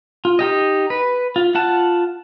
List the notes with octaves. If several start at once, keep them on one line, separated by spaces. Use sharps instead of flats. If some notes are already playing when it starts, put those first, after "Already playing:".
F4
D#4 G4 D#5
B4
F4
F4 F#5 A5